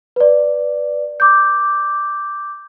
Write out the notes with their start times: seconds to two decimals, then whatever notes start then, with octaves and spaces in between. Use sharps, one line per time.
0.16 B4 D5
1.20 D6 G6